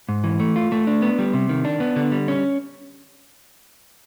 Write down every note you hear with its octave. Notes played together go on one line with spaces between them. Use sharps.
G#2
E3
A3
F4
A3
D4
B3
G3
C3
D#3
D4
B3
D3
G3
C#4